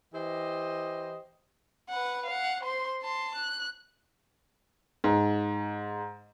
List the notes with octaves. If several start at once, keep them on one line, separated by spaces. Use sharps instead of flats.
E3 G4 C5 D#5
B4 F#5
F5 F#5
C5 C6
A5 C6
F#6
G#2